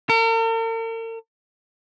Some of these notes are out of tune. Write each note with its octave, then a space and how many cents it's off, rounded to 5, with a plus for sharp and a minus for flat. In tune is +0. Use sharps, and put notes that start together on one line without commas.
A#4 -45